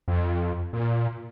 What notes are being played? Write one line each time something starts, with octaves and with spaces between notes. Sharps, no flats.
F2
A#2